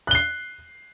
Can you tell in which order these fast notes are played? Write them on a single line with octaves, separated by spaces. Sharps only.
F#6 G7 C7